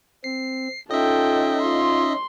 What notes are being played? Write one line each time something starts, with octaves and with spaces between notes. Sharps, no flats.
C4 C7
C#4 D#4 F4 A4 D#5 E5 G5
F4 C6